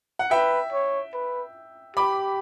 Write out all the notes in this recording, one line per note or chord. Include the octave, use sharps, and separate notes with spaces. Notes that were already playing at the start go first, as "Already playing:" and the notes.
F#5
B4 E5 G5
C#5
B4
G4 B5 D6